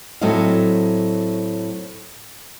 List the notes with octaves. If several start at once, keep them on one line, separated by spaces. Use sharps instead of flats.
A2 F#3 A3 C4 D#5 F5